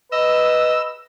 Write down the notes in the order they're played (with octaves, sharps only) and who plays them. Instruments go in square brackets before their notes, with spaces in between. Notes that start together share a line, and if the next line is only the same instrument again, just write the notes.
[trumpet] B4 [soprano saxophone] D#5 [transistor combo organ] E6